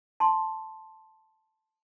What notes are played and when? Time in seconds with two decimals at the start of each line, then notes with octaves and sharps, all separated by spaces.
0.20 A5 C6